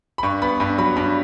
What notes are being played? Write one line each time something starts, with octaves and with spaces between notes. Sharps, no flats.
B5
G2 C#6
B3 B5
G2 B5
F#3 B5
G2 B5